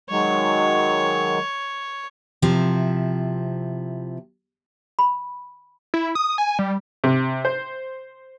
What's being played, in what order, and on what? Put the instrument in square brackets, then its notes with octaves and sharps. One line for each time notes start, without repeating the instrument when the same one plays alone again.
[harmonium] D#3 F#3 G#3 [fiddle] C#5
[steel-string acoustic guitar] C3 F3 C4 E4
[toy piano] B5
[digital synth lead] E4
D#6
G#5
G3
[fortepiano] C3
C5